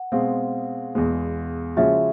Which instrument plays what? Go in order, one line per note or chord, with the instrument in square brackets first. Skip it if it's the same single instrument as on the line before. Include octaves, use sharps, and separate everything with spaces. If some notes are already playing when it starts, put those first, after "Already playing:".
Already playing: [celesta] F#5
[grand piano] B2 G#3 C4 [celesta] F5
[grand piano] E2 B2 G#3
[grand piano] C#3 F3 G#3 C#4 F#4 [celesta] E5